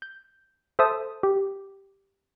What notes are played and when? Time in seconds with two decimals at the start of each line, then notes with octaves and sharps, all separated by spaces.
0.02 G6
0.79 A4 C5 E5 A5 D#6
1.23 G4